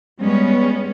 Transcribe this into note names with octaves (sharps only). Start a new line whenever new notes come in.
G3 G#3 B3 C#4